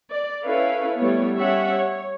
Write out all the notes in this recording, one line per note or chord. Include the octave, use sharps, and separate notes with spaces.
D5
C#4 E4 A4 B4 C#5 F5
G3 A3 B3 E4 C#5
G3 C#4 C#5 E5 F#5
C#5